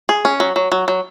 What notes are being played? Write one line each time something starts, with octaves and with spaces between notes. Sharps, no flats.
G#4
C#4
F#3
F#3
F#3
F#3